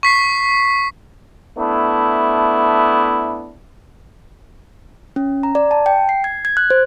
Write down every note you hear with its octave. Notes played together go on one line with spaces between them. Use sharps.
C#6 B6 C7
A3 B3 D4 E4
C#4
A#5
D5
A5
G5
C7
G#6
G#6
F#6
C5